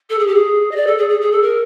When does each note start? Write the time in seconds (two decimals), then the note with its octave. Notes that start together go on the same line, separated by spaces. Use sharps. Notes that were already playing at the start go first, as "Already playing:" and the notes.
0.10 A4
0.19 G#4
0.27 G4
0.35 G#4
0.71 D#5
0.75 D5
0.87 A4
0.98 G#4
1.09 G#4
1.21 G#4
1.31 A4
1.42 A#4